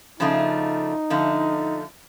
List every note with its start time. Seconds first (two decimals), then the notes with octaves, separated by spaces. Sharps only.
0.20 C#3 F3 A3 D4 D#4
1.10 D3 F3 A3